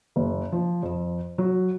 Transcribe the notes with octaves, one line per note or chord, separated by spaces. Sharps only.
F#1
F3
F2
F#3